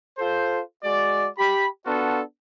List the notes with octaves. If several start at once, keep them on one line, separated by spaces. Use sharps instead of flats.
F4 A4 C5
G#3 F#4 D5
G4 B5
B3 D4 F4 F#4 A4